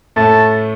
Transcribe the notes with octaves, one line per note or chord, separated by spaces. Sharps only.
A2 A3 A5